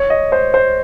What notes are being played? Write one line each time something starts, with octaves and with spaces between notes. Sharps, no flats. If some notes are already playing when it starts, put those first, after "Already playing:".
Already playing: C#5
D#5
C5
C5